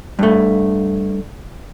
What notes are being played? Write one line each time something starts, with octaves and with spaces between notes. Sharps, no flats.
G2 A3